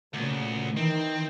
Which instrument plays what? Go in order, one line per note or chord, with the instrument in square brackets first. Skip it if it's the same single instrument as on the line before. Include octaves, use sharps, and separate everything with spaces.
[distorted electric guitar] D2 [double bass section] A#2 C#3
[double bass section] D#3 E3 [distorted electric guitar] C4